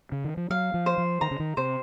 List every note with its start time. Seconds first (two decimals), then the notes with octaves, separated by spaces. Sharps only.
0.12 C#3
0.24 D#3
0.37 F3
0.50 F#3 F5
0.74 F3
0.86 C5
0.98 F3
1.21 D#3 A#5
1.31 C#3
1.40 D#3
1.57 C3 C5